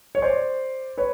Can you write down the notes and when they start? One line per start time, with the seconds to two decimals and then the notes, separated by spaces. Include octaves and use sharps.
0.15 C#5
0.22 C5 D5
0.98 B4 C#5